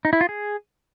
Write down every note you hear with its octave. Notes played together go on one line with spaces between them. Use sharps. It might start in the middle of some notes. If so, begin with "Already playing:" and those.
D#4
E4
F4
G#4